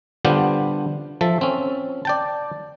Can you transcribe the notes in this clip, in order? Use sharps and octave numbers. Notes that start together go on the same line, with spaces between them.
D3 G3 B3 D4 F4 C5
F3 A4 E5
C4 C#4
D5 G5 A5